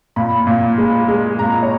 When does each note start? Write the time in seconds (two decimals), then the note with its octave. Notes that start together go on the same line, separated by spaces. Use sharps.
0.16 A#2 B5
0.47 A#2
0.78 G#3
1.08 G#3
1.39 A#2 A#5
1.62 C#5